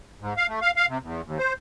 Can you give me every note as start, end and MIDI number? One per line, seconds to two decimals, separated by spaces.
0.21 0.34 44
0.37 0.47 77
0.48 0.60 57
0.62 0.71 77
0.76 0.86 77
0.89 0.98 48
1.03 1.21 40
1.25 1.38 39
1.39 1.53 72